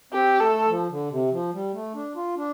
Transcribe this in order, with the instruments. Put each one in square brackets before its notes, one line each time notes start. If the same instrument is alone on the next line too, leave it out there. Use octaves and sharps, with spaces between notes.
[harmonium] C4 [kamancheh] G4
[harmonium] A3 [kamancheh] A4
[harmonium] F3
D3
C3
F3
G3
A3
D4
F4
D4